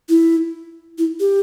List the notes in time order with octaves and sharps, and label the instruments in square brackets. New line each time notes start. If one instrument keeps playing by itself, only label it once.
[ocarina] E4
E4
G4